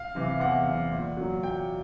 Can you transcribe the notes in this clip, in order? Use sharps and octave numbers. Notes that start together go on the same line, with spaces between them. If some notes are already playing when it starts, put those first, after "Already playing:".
Already playing: F5
C3 E3
E2 F#5
C3 E3
A#2
F#3
A#2 G5